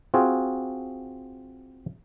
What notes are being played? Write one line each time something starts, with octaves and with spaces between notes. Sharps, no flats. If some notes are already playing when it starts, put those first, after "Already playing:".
C4 F4 F#4 G#4